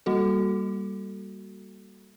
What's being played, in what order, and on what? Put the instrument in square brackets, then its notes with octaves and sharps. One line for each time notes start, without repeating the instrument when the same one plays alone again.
[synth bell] G3 A#3 F#4 A4